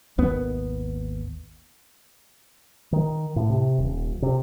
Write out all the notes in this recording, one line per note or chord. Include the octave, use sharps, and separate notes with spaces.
G#1 D#2 B3
D#3
A2
C3
D#1
C3